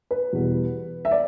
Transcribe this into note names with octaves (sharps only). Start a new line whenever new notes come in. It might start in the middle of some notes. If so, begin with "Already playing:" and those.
B4
E2 B2 G3
E5
D5